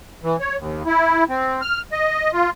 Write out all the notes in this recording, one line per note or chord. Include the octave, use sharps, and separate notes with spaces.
E3
C#5
D#2
E4
C4
F6
D#5
F4